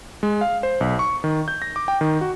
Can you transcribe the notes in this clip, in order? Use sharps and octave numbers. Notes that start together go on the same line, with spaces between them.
G#3
F5
C5
B1
C#6
D#3
G6
A#6
D6
G5
D#3
F#4